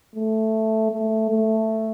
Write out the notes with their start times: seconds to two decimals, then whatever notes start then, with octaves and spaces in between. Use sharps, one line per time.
0.16 A3
0.92 A3
1.30 A3